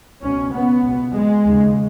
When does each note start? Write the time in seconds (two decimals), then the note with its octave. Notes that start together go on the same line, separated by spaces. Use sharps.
0.22 C#2 B2 C#4
0.53 B3
0.84 C#2 B2
1.14 G#3
1.45 D#2 C#3